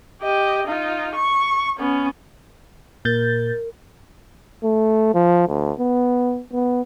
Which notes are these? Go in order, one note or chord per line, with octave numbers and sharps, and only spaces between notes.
G4 D#5
D#4 F4
C#6
B3 C#4
A#2 A#4 G6 A6
A3
F3
D2
B3
B3